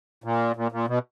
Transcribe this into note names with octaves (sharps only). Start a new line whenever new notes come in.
A#2
A#2
A#2
B2